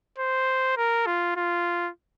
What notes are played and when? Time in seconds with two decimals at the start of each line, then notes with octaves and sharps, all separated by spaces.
0.18 C5
0.77 A#4
1.06 F4
1.37 F4